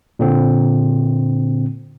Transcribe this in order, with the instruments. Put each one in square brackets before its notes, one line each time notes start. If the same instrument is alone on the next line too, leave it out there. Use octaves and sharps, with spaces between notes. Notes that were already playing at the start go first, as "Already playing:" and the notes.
[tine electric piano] A#2 D3 C4